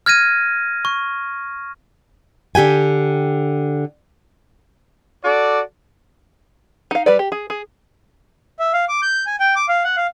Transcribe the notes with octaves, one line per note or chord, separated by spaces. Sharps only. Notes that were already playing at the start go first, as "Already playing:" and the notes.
F6 G#6 A#6 D#7
C#6
D3 G4 G5 G#5
F#4 A4 D5
D#4 F5
G3 B4 D5
G4
G#4
G#4
E5
F5
D6
G6
G#5
G5
D6
F5
F#5
F5